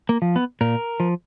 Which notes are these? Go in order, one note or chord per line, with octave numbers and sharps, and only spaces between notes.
A#3
F3
B3
A#2 A#4
F3